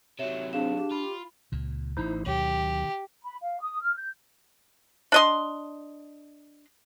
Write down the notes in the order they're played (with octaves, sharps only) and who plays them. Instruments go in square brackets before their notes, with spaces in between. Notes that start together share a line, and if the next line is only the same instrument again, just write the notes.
[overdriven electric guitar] C3 F#3 [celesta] C#5 E5 E7
[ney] C4 [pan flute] D4 [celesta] G#4 F5 E7
[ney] G4
[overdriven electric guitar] F4 [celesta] B5
[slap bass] C#2 A#2
[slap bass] A1 A2 [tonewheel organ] D#4 E4 C5
[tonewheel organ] D2 F#3 [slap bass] B2 D#3 [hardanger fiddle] G4
[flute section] B5
F5
D#6
F6
G6
[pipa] D4 D#5 C6